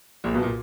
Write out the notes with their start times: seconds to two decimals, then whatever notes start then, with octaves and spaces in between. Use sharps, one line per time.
0.24 A#1 A#2
0.34 B1 B2
0.43 A#2